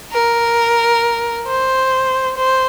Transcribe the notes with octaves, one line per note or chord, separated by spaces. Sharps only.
A#4
C5
C5